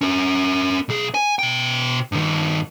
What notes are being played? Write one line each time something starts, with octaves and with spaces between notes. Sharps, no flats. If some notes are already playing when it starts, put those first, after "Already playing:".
C#4 A#4
B1 G#4
G#5
B2 G5
G2 D#3